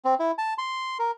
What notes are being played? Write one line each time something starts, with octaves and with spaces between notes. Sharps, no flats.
C4
E4
A5
C6
A#4